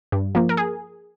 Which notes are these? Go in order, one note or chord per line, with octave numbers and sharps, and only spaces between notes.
G2
F3 A#3
A#4
G#4